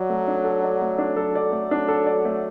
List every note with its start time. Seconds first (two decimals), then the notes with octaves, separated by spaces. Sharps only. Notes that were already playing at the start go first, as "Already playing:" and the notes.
Already playing: F#3 D5
0.09 A3
0.28 D4
0.44 A4
0.64 D5
0.82 A3
0.98 D4
1.16 F#3 A4
1.35 D5
1.52 A3
1.71 D4
1.88 A4
2.07 D5
2.25 A3